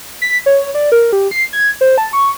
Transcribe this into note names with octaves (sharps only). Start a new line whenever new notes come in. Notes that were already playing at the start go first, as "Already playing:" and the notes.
B6
C#5
D5
A#4
G4
C7
G#6
C5
A5
C#6